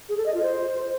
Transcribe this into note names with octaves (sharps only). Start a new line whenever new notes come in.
G#4
A4
D#5
F4
C5